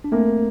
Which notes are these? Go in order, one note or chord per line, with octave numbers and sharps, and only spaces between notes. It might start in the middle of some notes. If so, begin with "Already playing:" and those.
D4
A3 A#3 C4